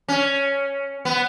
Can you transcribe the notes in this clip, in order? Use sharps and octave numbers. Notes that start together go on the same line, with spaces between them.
C#4
B3